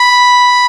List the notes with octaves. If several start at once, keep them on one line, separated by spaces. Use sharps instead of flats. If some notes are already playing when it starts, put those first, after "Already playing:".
Already playing: B5